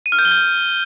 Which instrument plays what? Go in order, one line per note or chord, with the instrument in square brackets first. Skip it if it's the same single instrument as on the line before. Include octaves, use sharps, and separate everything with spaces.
[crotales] D#7
F6
G6
G7
G6